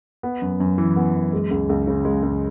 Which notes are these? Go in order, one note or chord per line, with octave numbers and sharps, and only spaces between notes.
B3
F#2
F#2
E3
B3
F#2
G#3
C#2
C#2
C#3
G#3
C#2